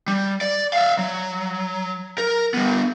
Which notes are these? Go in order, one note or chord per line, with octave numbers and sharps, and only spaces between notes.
G3
D5
E5 F5
F#3
A#4
G3 B3